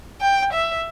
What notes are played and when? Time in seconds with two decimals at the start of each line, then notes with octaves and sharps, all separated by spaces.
0.21 G5
0.53 E5